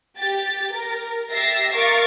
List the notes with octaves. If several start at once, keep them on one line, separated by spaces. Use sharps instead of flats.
G4 A6
A#4
G4 E5 A6 A#6 C7
A#4 F5 C#6 D6 A6